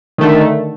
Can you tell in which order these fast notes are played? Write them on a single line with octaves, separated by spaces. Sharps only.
D#3 A3 D3